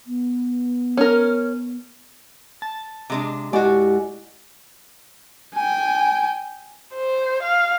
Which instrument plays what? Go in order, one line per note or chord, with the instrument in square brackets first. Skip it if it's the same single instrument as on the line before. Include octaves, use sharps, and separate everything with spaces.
[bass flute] B3
[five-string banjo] C#4 A#4
[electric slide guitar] A5
[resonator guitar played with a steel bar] C3 G#3 D4
[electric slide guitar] G#3 E4 [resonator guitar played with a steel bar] F#4 D5 [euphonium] G4 [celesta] D#5 F#5 G#5
[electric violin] G5 G#5
[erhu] C5
F5